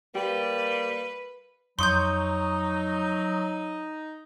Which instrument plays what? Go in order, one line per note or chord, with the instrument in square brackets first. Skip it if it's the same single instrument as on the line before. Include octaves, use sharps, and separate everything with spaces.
[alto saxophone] G3 [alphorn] A#3 [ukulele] G4 [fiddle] B4
[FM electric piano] F2 C#6 D#6 [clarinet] F#3 [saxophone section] D#4 [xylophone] C6 G6